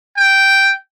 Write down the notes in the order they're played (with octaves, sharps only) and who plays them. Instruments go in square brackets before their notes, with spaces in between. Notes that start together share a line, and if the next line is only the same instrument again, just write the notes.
[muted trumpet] G5